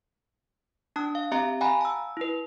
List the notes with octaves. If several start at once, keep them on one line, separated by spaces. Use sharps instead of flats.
D4 A5 D#6 F#6
F5
C4 G4 E5 F5 A#5
F5 F#5 G#5 A#5 B5 F#6
A5 E6
E4 B4